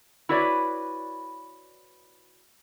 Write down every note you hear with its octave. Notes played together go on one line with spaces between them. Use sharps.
E4 F#4 B4 C#5 D5